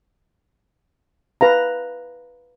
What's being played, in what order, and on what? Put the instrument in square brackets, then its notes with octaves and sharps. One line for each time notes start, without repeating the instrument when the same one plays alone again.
[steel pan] B4 F5 A#5